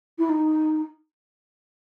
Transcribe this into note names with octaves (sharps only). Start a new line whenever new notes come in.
E4
D#4